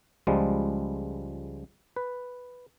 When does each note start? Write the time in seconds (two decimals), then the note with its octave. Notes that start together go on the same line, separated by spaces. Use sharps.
0.27 C#2 F3 G3 G#3
1.96 B4